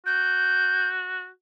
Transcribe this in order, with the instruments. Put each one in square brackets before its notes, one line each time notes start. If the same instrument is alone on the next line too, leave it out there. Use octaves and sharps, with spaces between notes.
[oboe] F#4 [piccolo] G6